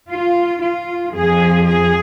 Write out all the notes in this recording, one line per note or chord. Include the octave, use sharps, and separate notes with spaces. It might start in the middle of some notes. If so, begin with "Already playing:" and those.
F4
F4
F2 F3 G#4
G#4